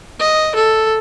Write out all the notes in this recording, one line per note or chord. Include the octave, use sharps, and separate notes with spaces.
D#5
A4